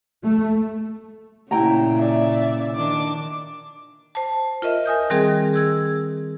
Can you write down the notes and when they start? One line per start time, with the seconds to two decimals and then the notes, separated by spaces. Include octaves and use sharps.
0.23 A3
1.51 A#2 C#3 E4 G5 A#5
1.99 D5 E5
2.76 D#3 D4 D6
4.15 C5 A5
4.62 F4 A#4 D#5 E5
4.86 A#4 G#5 D#6 G6
5.10 D#3 G3 C4 G#4 A#4
5.54 G#4 E6 G#6